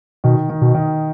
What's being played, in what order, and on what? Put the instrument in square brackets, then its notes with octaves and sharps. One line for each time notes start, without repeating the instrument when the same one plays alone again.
[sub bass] B2 [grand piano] D#3
[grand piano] D#3
[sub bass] B2
[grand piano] D#3